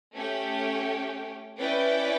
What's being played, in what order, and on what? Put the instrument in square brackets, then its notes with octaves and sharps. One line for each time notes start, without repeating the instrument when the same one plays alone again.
[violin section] A3 C#4 G4
C#4 E4 B4 D5 G5